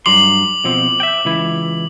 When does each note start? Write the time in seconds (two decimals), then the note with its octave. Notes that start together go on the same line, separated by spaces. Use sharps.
0.06 G2 F#3 C6 D6 F#7
0.64 B2 F3 C4
1.00 E5 G5
1.25 C#2 E3 E4